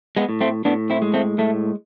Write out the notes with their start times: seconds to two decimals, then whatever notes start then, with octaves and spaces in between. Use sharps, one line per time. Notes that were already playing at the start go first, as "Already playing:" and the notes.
0.17 G#3 B3
0.29 A2
0.41 A3 C4
0.65 A2 B3 D4
0.90 C4 E4
1.02 G#3
1.13 A3 C4
1.38 A2 A3